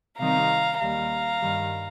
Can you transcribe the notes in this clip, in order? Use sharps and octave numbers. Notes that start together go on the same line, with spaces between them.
C3 D#3 G3 C4 D#4 F5 A#5
D#2 D#3 G3 F5 A#5
G2 D#3 G3